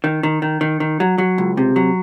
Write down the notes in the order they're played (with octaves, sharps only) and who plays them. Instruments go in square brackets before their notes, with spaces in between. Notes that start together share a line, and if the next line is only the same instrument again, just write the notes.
[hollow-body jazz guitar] D#3
D#3
D#3
D#3
D#3
F#3
F#3
C#2
C3
F#3